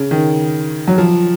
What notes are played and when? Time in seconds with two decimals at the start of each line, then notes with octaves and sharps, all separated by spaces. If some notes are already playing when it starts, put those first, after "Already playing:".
Already playing: C#3
0.11 D#3
0.87 F#3
0.98 F3